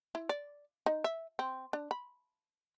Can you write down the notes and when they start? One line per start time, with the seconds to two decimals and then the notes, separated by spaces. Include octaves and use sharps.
0.15 E4
0.29 D5
0.86 D#4
1.04 E5
1.39 C4
1.73 D4
1.91 B5